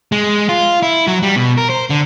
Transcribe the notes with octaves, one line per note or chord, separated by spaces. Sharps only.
G#3
F4
E4
F#3
G3
B2
A#4
C5
D3